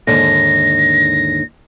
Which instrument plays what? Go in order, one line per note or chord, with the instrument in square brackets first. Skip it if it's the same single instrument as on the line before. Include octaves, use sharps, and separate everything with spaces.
[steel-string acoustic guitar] D#2 G#2 D3 [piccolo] A#6